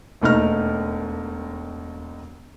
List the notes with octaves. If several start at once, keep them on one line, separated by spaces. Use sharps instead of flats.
E1 D#2 A3 D#4 F6